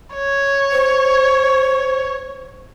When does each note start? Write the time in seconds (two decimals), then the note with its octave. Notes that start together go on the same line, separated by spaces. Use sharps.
0.14 C#5
0.72 C5